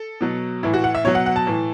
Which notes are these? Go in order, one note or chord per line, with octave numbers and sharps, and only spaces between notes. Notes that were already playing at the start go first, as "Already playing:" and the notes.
Already playing: A4
B2 F#3
A2 E3 E4
F#4
F#5
E5
B2 F#3 C#5
F#5
F#5
A5
A2 E3